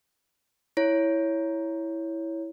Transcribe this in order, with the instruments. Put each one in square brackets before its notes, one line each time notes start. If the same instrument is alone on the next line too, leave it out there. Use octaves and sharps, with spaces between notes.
[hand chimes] E4 C#5